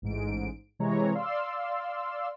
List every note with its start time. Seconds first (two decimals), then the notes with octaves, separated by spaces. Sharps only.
0.02 A1 G#2 D7
0.79 C3 E3 G#3 C#5 A#5
1.15 D5 F5 C6 E6